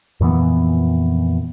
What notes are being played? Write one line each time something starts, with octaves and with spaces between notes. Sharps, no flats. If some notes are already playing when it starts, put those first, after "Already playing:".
F2 A#2 E3 B3